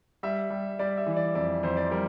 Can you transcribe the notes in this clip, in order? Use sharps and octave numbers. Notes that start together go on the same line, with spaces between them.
G3 E5
G3
G3 D5
E5
E3
D5
F2 D5
F2 C5
D5
G3 A#4